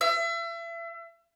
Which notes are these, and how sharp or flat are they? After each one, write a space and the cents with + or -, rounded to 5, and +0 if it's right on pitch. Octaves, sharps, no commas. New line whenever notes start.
E5 +35